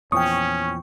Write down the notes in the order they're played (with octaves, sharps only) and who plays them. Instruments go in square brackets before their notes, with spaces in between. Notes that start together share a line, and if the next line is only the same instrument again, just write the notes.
[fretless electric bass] E2 A#2 F3 [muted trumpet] C#4 [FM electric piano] G5 C#6 [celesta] D#6